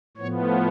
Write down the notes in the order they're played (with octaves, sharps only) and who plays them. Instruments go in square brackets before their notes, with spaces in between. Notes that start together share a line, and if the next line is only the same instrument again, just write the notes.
[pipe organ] A2 F3 B3 C#5